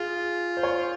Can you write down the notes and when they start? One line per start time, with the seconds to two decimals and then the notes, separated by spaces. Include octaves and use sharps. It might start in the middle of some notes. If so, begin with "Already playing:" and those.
Already playing: F4 G#4
0.57 C5
0.63 C#5